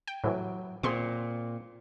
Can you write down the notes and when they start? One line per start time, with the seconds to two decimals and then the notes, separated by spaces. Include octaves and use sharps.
0.07 G5
0.24 A2 C3 E3 F#3
0.83 A#2 C4 G#4 C5 C6 C#6